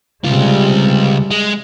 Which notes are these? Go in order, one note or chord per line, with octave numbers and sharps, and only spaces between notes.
C#2 C3 G3 G#3 F4
G#3